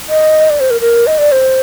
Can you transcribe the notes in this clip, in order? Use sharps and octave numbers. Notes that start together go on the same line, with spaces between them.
D#5
D5
C5
A#4
A#4
D#5
D5
C5